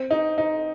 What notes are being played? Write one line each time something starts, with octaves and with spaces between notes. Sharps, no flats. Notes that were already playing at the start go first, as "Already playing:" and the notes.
Already playing: C4
D#4
D#4